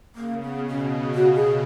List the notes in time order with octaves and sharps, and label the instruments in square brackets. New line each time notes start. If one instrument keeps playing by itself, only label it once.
[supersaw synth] C#3 [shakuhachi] A#3
[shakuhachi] B3
[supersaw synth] B2
[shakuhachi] C#4
[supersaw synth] C#3
[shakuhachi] F#4
G#4